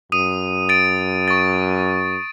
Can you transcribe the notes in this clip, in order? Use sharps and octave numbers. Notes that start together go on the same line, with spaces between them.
F#2 D#6 D#7
A6 D7
C#6 A6